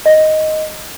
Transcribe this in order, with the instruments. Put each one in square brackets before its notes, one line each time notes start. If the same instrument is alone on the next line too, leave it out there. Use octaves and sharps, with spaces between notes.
[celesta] D#5